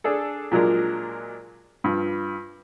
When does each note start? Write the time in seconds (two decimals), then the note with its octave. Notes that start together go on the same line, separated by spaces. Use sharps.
0.04 D4 G#4 A4
0.51 A#2 F3 F#3 G#3 D4 A#4
1.84 G2 F3